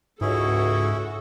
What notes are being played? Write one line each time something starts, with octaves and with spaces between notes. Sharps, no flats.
C#2 G#2 C#4 E4 F#4 G#4 A4